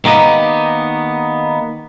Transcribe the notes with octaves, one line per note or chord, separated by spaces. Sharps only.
D#3 A#3 B3 D#4 G4